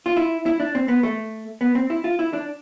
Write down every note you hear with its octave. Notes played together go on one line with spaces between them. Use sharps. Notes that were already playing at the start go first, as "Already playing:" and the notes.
F4
E4
E4
D4
C4
B3
A3
B3
C4
E4
F4
E4
D4